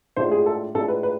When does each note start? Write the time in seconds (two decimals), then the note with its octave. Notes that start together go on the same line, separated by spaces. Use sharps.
0.16 A2 G#3 D4 F4 C5
0.31 G#4
0.46 A4
0.75 A2 G#3 D4 F4 A4
0.88 B4
1.03 B4